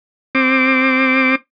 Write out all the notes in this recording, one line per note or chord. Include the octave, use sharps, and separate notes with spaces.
C4 D6